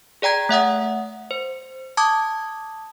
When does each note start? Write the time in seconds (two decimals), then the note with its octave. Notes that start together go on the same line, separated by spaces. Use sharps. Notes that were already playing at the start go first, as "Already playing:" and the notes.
0.22 G#4 D5 G5 A#5 G#6
0.49 A3 E5 F#5 D#6
1.31 C5
1.97 A5 D6 D#6 G#6